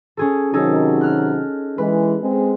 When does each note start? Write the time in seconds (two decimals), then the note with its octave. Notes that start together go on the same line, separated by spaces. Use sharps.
0.17 C#4 G#4 A4
0.53 C3 D#3 F#3 D#4 G#4 A4
1.01 F6 F#6
1.78 E3 G#3 B4
2.21 G#3 C4